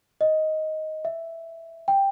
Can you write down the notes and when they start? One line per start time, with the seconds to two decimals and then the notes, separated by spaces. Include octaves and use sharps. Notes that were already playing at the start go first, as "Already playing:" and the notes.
0.21 D#5
1.05 E5
1.88 G5